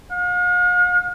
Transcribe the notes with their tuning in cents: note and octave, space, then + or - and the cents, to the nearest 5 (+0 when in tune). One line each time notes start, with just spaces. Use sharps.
F5 +45